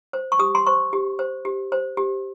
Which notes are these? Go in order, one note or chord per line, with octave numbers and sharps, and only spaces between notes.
C5
C#6
G4 D#6
C6
C5 C#6
G4
C5
G4
C5
G4